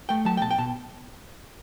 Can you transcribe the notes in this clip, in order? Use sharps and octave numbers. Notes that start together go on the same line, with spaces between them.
A3 G5
F#3 A5
G5
B2 A5
G5
B2 A5